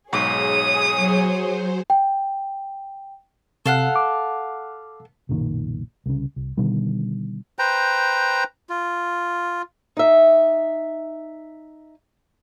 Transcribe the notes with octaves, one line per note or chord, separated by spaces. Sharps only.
B1 G#2 G#4 C#5 C#6 D#6
F#3 C5
G5
C3 A4 F5 F#5
D6
F#1 B1 A#2 D#3
C2 C#3
C2
B2 D3 D#3 G3
B4 C5 G5 A#5
F4
D#4 E5